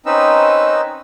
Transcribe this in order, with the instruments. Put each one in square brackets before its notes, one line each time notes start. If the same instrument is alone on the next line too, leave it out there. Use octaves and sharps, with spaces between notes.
[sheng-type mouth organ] C4 C#4 D#4 B4 D#5 E6